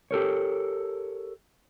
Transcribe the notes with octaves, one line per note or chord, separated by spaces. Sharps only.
G4 A4 A#4 C#5